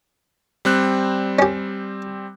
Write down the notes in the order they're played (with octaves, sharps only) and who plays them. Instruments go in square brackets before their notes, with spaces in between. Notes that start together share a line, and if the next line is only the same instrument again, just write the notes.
[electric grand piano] G3 C4 F#6
[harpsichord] C#4 G4